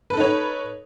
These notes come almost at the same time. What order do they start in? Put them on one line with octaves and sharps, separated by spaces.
B4 A4 D#4 C#5